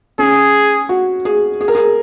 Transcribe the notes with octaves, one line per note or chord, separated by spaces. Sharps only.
C#4 G#4
F#4
G#4
G#4
A#4
G#4